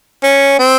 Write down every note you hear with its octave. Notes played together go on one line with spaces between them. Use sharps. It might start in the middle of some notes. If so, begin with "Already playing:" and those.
C#4
C4